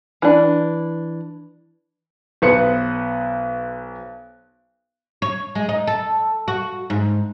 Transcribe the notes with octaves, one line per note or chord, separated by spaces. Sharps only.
E3 D4
B1 B3 B4 C5 C#7
C#5
G#3
D#4
A4
F#4
G#2